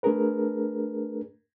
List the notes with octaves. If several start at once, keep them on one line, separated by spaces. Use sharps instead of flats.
A3 D4 G#4 A#4 B4